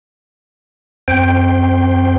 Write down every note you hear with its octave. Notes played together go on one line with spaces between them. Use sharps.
F#2 C4 C5 G5